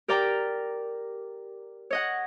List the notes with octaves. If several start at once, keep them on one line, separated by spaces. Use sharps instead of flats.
G4 A#4 D5 G5 A#5
C#5 D#5 F#5